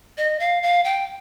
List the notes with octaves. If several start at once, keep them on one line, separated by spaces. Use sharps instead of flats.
D#5
F5
F5
G5